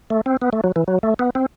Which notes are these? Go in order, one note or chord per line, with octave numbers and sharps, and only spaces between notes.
A3
C4
B3
A3
F#3
E3
F#3
A3
B3
C4